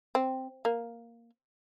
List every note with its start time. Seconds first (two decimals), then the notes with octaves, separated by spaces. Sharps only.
0.15 C4
0.65 A#3